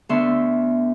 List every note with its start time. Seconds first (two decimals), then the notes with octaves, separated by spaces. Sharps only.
0.09 D2 D3 B3 E5 C6 C#6